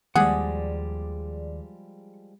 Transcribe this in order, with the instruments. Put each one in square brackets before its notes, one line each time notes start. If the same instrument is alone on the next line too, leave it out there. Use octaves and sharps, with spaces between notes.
[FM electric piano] D#2 D5 [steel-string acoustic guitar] F3 G3 G#3 [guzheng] G#4 [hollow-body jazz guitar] F#5